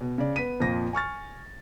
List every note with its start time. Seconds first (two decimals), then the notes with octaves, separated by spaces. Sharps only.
0.01 B2
0.18 C#3 D5
0.36 B3 B6 D#7
0.60 F2 A#2 F3 A#6
0.93 G#5 C#6 F6 A6